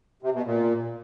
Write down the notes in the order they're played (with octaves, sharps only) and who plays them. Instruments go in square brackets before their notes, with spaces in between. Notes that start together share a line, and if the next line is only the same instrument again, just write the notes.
[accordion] C3
B2
A#2